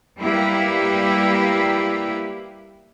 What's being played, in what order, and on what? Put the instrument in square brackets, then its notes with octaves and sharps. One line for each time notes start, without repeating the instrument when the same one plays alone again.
[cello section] G3 A#3 E4 G4 B4